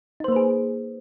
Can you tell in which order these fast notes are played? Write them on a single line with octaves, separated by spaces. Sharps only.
D#4 C5 A#3 B4 G#4